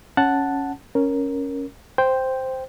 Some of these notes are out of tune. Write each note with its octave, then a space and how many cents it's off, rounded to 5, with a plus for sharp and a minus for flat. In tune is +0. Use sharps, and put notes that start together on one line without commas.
C#4 +0 F#5 +0 A5 +0
C#4 +0 A#4 +0
C5 +0 G5 +0